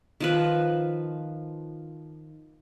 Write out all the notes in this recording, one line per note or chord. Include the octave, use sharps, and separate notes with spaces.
D#3 F3 B4